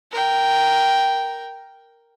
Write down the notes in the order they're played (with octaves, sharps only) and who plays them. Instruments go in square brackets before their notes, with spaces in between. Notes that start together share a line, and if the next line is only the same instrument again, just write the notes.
[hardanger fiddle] A#4 G5